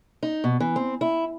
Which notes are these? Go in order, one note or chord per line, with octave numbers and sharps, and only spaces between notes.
D#4
B2
E3
C4
E4